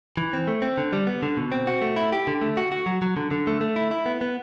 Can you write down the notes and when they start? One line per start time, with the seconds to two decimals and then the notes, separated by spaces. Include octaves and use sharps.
0.17 E3
0.33 C4
0.48 A3
0.62 C4
0.78 D3
0.93 G3
1.07 B3
1.23 D3
1.37 B2
1.52 C4
1.67 F#4
1.82 A3
1.96 E4
2.12 G4
2.27 D3
2.41 A3
2.57 F#4
2.72 F#4
2.86 F#3
3.02 F#3
3.17 D3
3.31 D3
3.47 A3
3.61 A3
3.76 E4
3.91 E4
4.06 B3
4.21 B3